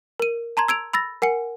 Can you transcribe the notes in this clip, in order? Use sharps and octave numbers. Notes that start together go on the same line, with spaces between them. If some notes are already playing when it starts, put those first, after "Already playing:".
A#4 D#7
A5 A#5 C6 G#6
E6 G#6 D7 F7
B5 E6 A6 A#6
A#4 F#5 G#5 C#7